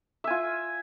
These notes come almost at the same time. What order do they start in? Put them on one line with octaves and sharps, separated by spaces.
E5 G#5 F4